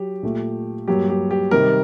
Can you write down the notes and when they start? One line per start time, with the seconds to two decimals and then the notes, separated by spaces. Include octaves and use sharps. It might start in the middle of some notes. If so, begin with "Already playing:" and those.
Already playing: F#3 G4
0.23 A#2 A3
0.88 G2 F#3 A#3 G4
1.09 G4
1.31 G4
1.51 C3 D#3 G3 A#4